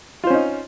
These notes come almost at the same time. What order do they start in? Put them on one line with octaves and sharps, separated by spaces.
F4 C5 C#4 D#4